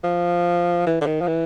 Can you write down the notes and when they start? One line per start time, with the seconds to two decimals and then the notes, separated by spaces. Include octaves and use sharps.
0.04 F3
0.87 E3
1.01 D3
1.06 D#3
1.21 F3
1.27 E3